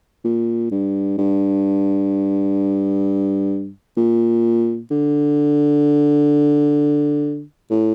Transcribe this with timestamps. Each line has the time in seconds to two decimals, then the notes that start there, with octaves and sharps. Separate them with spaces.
0.24 A#2
0.71 G2
1.18 G2
3.97 A#2
4.91 D3
7.70 A2